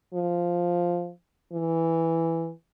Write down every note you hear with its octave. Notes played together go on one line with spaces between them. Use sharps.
F3
E3